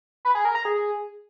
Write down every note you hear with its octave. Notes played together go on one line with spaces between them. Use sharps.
B4
G#4
A#4
A#5
G#4